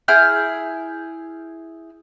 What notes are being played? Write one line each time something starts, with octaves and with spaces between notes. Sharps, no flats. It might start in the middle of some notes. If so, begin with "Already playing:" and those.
E4 G#4 F6 G6